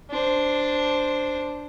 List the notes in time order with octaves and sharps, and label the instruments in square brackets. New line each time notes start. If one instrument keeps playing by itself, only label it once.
[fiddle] D4 C5